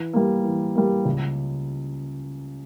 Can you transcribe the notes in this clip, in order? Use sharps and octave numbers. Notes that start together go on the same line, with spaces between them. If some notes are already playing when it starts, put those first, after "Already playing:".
Already playing: E3
G3 A#3
E3
G3 A#3
C#2